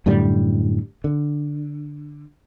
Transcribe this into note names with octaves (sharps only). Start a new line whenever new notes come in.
F#2 A2 D3 G3
D3